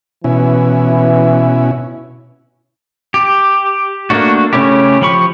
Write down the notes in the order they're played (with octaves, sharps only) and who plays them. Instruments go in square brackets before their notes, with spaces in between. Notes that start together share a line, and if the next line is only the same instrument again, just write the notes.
[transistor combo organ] B2 C#4 E4 [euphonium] E3
[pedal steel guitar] G4
A3 A#3 D4 F#4
C#3 A3 C#4 E4 G4
F3 G4 B5 C#6